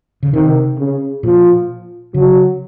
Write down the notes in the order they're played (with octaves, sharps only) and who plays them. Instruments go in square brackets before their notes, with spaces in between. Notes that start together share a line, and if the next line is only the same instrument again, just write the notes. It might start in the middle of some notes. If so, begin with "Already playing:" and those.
[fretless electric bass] C#3
[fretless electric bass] C3 [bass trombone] D#3
[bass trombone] C#3
[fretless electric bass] A#2 [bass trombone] F3
[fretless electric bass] C#3 [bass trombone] F#3